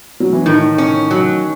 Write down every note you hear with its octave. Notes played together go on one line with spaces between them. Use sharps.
F#3
E3
A2 D#3
C#4
F#3